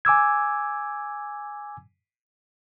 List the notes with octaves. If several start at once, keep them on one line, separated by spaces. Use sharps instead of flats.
G#5 D6 E6 G#6